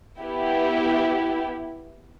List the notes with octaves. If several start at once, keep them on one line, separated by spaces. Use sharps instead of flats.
B3 E4 G4